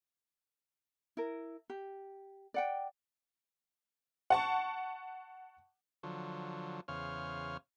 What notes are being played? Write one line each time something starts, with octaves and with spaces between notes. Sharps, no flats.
E4 A#4
G4
D5 F#5 G5
F#5 A5 C#6
D3 F3 F#3
E2 C#3 C5 C#5 F5 F6